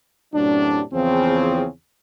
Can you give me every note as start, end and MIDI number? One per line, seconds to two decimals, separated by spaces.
0.34 0.81 42
0.34 0.81 45
0.34 0.81 48
0.34 0.81 54
0.34 0.81 62
0.93 1.66 40
0.93 1.66 49
0.93 1.66 53
0.93 1.66 60